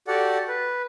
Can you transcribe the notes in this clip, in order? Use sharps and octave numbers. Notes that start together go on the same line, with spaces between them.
F#4 G4 A4 D5 F#5
B4